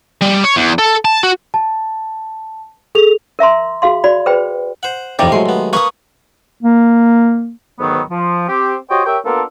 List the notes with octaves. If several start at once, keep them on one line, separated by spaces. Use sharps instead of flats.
G3
C#5
E2
A4
A5
F#4
A5
G#4 A4 F7
A#4 E5 A#5 C6
F#4 G#4 F5 C6
F#4 D5 B5
G#4 B4 C5 G5 B5
C5 F#5
F2 A2 C3 F3 D#4 G4 D5
F#3 G#3 A3 C6
D#2 B3
A#3 B4 G#5 C#6 D#6
A#3
D2 G#2 D#3 F#3 B3
F3
C4 G4
F#4 G4 C5 C#5 D#5 G5
G4 A#4 C#5 E5 G5
A#3 B3 D4 F4 A4 A#4